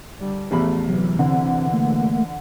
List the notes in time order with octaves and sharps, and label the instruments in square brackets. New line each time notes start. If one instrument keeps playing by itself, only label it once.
[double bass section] D3 G3
[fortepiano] A1 E2 B5 [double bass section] F3 A3
[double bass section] C3 E3 [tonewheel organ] F#3
[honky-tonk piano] D3 [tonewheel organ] C4
[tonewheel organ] A3 A#3